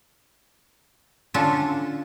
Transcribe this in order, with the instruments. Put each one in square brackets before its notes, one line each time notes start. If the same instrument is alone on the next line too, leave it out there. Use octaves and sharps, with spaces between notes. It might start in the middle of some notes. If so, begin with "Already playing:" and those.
[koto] D3 C#4 D4 F4 A4